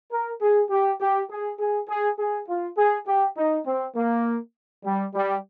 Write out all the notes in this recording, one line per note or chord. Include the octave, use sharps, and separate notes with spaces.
A#4
G#4
G4
G4
G#4
G#4
G#4
G#4
F4
G#4
G4
D#4
C4
A#3
G3
G3